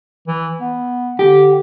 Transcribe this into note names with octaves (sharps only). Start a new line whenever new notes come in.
E3
B3
D3 G4